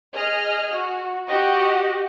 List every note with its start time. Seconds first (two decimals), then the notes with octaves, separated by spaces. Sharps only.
0.11 G#4 D#5 F6
0.73 F#4
1.27 F#4 G4 D#5 F#5